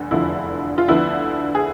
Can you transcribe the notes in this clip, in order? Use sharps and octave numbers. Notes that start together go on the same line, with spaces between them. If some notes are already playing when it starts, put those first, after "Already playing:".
Already playing: F1 E2 D3
F1 E2 D3 F3 E4
F4
D2 D3 F3 B3 E4
G#4